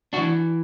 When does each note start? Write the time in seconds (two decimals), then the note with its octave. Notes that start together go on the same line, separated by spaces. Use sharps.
0.13 D4 F#4
0.17 E3